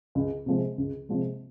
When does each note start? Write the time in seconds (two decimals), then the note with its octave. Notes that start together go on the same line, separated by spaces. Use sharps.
0.15 C#2
0.46 C3 F3 G#3
0.78 C#2
1.09 C3 F3 G#3